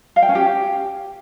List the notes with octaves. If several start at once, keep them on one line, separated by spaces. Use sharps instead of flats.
F5
G5
C#4
G4